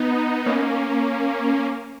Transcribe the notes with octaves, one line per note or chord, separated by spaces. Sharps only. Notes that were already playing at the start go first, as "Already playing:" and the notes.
Already playing: B3 D#4
A#3 C#4